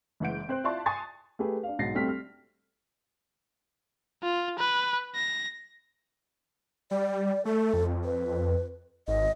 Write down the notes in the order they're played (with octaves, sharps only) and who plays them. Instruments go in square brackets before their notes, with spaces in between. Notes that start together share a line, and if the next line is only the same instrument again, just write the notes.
[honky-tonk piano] F#1 E3 G#3 F#5 G6 D7
C4 C5 F#6
E4 F4 D5 F5 A5 C6
G#5 A5 C6 C#6 D#6 A6
[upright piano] A3 G4 G#4 B4
D4 F5
B1 G#2 A6 A#6 C7
G3 A3 C4 F6 B6
F6
[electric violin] F4
B4
A#6
[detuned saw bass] G3 [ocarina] D5
[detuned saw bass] A3 [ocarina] A4
[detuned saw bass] F2
[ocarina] B4
[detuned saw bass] G#1 [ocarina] D#5